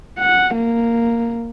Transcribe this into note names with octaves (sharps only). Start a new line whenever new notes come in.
F#5
A#3